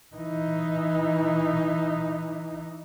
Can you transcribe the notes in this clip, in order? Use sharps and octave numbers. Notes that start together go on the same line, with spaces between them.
E3 D#4